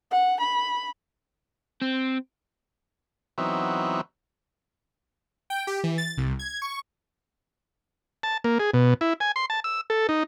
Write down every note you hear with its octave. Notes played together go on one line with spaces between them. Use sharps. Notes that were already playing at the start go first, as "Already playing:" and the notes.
F#5
B5
C4
E3 F#3 B3 C4 D#4 E5
G5
G4
E3
A6
C2
G#6
C#6
A5
A#3
G#4
B2
E4
G#5
C6
A5
E6
A4
D#4